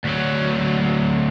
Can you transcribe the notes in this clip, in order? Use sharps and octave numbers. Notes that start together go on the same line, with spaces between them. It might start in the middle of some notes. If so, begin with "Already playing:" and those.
D2 F#3